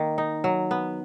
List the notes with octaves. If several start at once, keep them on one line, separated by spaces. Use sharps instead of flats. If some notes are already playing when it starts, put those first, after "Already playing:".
Already playing: D#3 A#3
D#4
F#3
B3